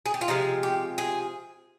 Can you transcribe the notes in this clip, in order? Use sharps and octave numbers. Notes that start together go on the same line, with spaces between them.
G#4
G4
F4
C3 F3 G#3 D#4
G4
G#4